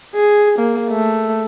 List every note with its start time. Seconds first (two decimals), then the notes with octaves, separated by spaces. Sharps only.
0.15 G#4
0.58 A#3
0.90 A3